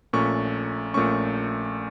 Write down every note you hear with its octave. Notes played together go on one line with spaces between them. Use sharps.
A#1 A#2 A3 C#4 C#6
A#1 A#2 A3 C#4 C#6